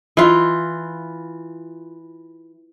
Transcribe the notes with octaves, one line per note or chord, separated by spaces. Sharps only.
E3 F4